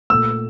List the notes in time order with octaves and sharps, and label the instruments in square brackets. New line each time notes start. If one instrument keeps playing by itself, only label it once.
[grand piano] A#2 A3 E6